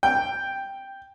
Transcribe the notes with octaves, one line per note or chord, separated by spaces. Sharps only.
G5